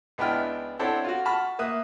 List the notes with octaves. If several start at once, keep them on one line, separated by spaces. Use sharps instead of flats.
C#2 B3 D4 E4 G5 F6
C4 D4 E4 A4 C#5 F#5
F4 F#4
F#5 A5 B5 C#6 F6
A#3 E5 D#6 F#6